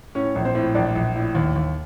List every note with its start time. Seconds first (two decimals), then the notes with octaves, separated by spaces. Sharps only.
0.15 A2 C#4 C#5
0.35 A#1
0.45 C4 C5
0.55 A2
0.75 A#1 D4 D5
0.95 A#1
1.16 A2
1.35 D#2
1.56 D#2